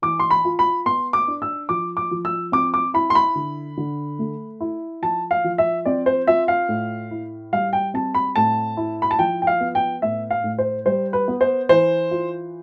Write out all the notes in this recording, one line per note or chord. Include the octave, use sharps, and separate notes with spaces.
E3 D6
C6
B5
F4
B5
B3 C6
D6
D4
E6
F3 D6
D6
F3
E6
C4 D6
D6
E4 B5
C6
B5
D3
D3
A3
E4
F3 A5
F5
F3
E5
C4 D5
C5
F4 E5
F5
A2
E4
G3 F5
G5
C4 A5
B5
A2 A5
E4
B5
A5
F3 G5
G5
F5
B3
G5
A2 E5
F5
A2
C5
G3 C5
B4
B3
C5
E3 C5
F4